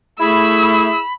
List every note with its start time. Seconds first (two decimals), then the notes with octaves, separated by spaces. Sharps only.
0.20 A3 E4 G#4 B5 E6